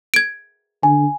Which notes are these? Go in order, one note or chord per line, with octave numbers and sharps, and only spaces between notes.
G#6 D7
D3 G#5